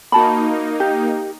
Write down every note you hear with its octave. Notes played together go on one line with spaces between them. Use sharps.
A#3 D#4 F#4 A5 B5
G4